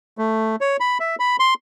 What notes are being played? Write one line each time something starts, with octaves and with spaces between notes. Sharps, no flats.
A3
C#5
B5
E5
B5
C6